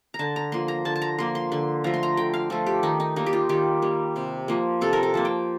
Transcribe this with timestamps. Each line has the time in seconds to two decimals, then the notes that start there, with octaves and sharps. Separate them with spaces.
0.14 A#5
0.19 D3 A5
0.36 A#5
0.52 F3 A#3 C6
0.68 A#5
0.85 D3 A5
0.96 A5
1.02 A#5
1.19 F3 A#3 C6
1.35 C6
1.52 D3 C6
1.84 F3 A3 A#5
1.94 C6
2.03 A#5
2.17 D3 G5
2.34 F5
2.50 F3 A3 A4
2.66 G4
2.83 D#3 D#4
3.00 D#4
3.16 G3 A#3 D#4
3.26 G4
3.33 F4
3.49 D#3 G4
3.82 G3 A#3
4.16 C3
4.48 F3 A#3
4.81 C3 A4
4.93 A#4
5.03 A4
5.14 F3 A#3 A5
5.25 G5